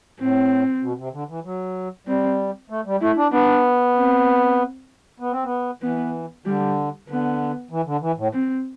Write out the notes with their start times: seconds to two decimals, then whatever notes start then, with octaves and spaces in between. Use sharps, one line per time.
0.20 A2 C4
0.82 B2
0.98 C3
1.13 D3
1.29 E3
1.45 F#3
2.07 G3 C4
2.70 A3
2.85 G3
3.01 A3 E4
3.17 D4
3.32 B3 D4
3.95 C4
5.20 B3
5.32 C4
5.44 B3
5.82 E3 B3
6.45 D3 G3
7.08 D3 B3
7.71 E3
7.86 D3
8.01 E3
8.17 A2
8.33 C4